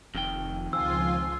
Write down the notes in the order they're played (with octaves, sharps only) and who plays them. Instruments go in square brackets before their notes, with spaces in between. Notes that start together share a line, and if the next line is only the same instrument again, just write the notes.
[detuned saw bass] F1 [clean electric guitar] F2 D#3 G5
[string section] C#2 F4 G#5 [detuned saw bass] F3 [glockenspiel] E6